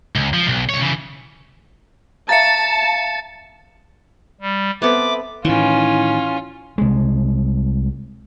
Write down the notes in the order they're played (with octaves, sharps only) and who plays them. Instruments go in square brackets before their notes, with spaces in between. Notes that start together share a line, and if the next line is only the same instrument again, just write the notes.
[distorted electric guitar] C#2
F3
B1
C2 C#5
C#3 E3
[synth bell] E5 F5 A#5 [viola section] A5 [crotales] A6 C#7
[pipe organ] G3
[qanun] B3 C4 A4 [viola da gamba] B4 [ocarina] E5 [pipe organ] D6
[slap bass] A2 D#3 [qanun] E3 [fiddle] C#4 F4
[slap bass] C2 G#3